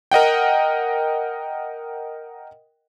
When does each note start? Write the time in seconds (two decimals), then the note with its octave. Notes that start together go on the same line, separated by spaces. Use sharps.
0.12 A#4 D#5 F#5 G5